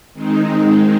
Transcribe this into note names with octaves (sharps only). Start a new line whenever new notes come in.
D#3 G#3 C4 D#4